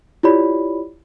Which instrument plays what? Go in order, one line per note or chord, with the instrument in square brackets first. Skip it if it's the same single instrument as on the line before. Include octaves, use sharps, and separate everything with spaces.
[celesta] E4 F4 G4 C#5 D5 B5